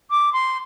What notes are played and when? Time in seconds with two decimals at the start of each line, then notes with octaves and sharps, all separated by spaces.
0.10 D6
0.33 C6